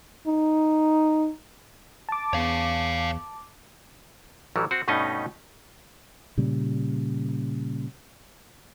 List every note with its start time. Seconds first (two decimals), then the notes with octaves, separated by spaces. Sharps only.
0.27 D#4
2.09 A5 D6
2.33 E2 C#5 F5
4.56 A1 E3 F#3 G3
4.71 C4 F#4
4.88 G2 B2 A3 C#4 D#4 D#5
6.38 A#2 C#3 G3